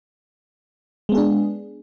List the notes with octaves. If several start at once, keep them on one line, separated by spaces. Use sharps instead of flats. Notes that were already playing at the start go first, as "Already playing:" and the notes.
G#3 B3 D4 G#4